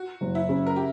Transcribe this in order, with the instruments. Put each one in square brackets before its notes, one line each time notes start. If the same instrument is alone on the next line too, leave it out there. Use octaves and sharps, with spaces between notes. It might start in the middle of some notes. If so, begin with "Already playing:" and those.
Already playing: [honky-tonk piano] F#4
[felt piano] F#1
[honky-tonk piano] E4
[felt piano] C#3
[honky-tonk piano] A#4
G4